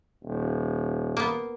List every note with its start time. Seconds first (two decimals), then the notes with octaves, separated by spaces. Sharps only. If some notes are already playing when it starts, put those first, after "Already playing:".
0.24 D#1
1.17 A#3 B3